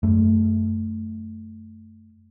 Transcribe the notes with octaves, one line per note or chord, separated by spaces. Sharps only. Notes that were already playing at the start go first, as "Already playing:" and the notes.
F#2 A3